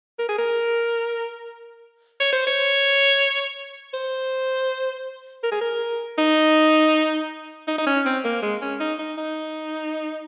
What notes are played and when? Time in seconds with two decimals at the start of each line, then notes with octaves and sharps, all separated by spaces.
0.19 A#4
0.29 G#4
0.39 A#4
2.20 C#5
2.33 C5
2.47 C#5
3.94 C5
5.43 A#4
5.52 G#4
5.61 A#4
6.18 D#4
7.68 D#4
7.78 D#4
7.87 C#4
8.05 C4
8.25 A#3
8.43 G#3
8.62 C#4
8.80 D#4
8.99 D#4
9.18 D#4